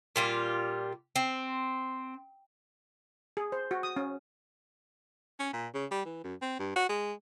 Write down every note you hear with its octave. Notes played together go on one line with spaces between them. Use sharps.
A#2 G3 F4
C4
G#4
C5
F#4
D#6
C#4
C#4
A#2
C#3
G3
E3
F#2
C4
G2
F#4
G#3